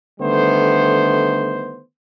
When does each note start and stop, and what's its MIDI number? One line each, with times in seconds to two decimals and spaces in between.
0.21 1.81 50
0.21 1.81 51
0.21 1.81 55
0.21 1.81 57
0.21 1.81 59
0.21 1.81 72